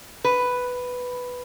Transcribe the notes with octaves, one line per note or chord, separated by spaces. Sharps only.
B4